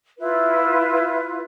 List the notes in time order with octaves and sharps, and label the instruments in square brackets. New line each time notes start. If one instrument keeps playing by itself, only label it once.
[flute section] E4 F4 B4